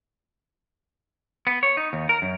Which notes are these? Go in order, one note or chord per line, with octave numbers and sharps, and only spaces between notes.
B3
C#5
D#4
D#2
A#4
F#2